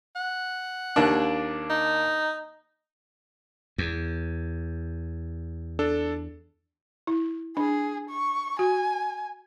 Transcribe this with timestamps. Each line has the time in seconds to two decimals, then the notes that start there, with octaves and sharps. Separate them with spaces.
0.16 F#5
0.96 D#2 A#3 D4
1.70 D#4
3.78 E2
5.79 D4 A4
7.07 E4
7.57 D4 G#4
8.09 C#6
8.59 F#4 G#5